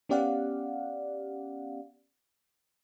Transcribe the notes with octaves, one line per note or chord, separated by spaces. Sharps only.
B3 C#4 G4 D5 F5 F#5